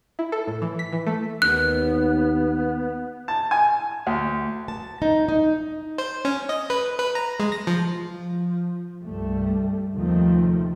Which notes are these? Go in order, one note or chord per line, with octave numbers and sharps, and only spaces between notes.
E4
A4
A2
E3
B6
E3
A3
D#2 B3 F#6
A5
G#5
D2
A5
D#4
D#4
C5
C#4
D#5
B4
B4
A#5
G#3
A#6
F3
F3
C2 G2 G3 A3
D#2 C3 D#3 F3 A3 C4